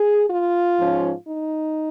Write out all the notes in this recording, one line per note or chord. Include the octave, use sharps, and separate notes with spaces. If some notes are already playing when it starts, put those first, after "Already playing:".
Already playing: G#4
F4
G#2 F3 C#4
D#4